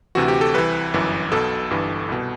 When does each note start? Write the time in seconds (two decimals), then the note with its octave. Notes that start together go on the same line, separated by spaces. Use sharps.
0.15 D2 C3 E3 F#4
0.28 G4
0.41 A4
0.54 C2 C3 E3 B4
0.94 G1 F#2 E3
1.31 B1 B2 A4
1.70 G1 G2 E3
2.09 C2 B2